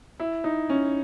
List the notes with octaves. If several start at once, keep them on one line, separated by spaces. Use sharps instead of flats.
E4
D#4
C#4